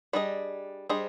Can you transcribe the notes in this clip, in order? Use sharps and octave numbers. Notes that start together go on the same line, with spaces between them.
G3 D4 G#4 C5 D#5
G3 D4 G#4 C5 D#5